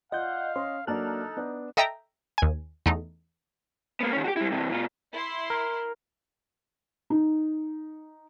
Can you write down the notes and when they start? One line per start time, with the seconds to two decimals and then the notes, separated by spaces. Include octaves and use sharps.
0.12 F4 D5 D#5 F5 F#5 G6
0.56 C#4 D#5 C6
0.87 F#3 A#3 D4 D#4 A4 A5 F6 F#6
1.37 B3 D4
1.77 A4 D#5 E5 G5 A#5
2.38 D#2 G#5
2.86 E2 A3 D#4
4.00 A#3 B3
4.13 D#3 C#4
4.24 F#4 G4
4.37 G3 E4
4.52 C3 E3
4.71 B2 F4
5.13 E4 C6
5.50 A#4
7.10 D#4